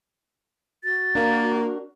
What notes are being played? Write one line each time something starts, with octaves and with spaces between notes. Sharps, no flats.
F#4 A6
A#3 D4 A#4